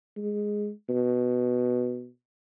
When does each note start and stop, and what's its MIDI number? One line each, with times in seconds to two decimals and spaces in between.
0.17 0.71 56
0.89 2.08 47